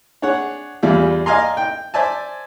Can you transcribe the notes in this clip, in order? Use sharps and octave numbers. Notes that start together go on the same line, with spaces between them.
D4 G#4 C#5 F#5
E2 G3 F4 G#4 E5
D5 D#5 F5 G#5 A#5 C6
G5
C5 D5 E5 G#5 A5